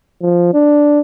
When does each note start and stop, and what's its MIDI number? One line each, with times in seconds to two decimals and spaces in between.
0.22 0.53 53
0.54 1.00 62